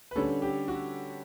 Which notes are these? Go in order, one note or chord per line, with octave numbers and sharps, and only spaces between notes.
B4
D3 G3 C#4 A4
G4
F#4